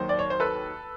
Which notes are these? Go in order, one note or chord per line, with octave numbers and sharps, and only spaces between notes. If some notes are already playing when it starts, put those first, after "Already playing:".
Already playing: D#2 D#3 F#3 C5
D5
C#5
C5
A4 B4